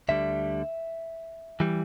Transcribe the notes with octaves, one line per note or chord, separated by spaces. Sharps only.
D2 D3 G3 E5
E3 G3